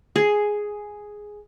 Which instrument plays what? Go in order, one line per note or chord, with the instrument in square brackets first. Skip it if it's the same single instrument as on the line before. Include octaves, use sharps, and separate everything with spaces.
[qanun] G#4